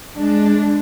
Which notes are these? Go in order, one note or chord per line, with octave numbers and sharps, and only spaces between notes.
G#3 D4